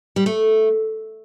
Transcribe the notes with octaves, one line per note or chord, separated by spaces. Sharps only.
G3
A3